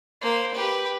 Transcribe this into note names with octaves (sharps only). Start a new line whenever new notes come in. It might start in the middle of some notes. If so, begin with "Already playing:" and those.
A#3 C5
G4 B4